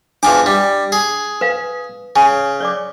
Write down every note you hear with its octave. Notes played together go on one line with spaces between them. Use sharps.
E2 F3 D4 D6
G3
G#4
B4 F5
C#3 G#5
C#5 D5 D6